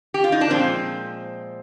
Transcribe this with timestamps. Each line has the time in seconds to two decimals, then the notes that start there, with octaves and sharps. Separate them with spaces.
0.14 G4
0.24 F4
0.32 D#4
0.41 D4
0.50 A#2 F3 G#3 C4